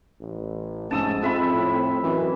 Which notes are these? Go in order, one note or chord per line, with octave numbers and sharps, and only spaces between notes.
A1
F1 G#2 C#4 A5 D#6 E6
F2 G#3 C4 E5 B5
A2
F#2 E3